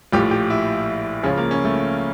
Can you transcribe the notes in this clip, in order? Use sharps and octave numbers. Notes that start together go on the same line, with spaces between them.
A#1 A2 F3 G4
G4
E4
C#2 C#3 F3 C#4
A#3
C#4
A3